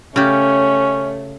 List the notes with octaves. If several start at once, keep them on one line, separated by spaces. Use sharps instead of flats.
C#3 A3 C#4 G4 C#5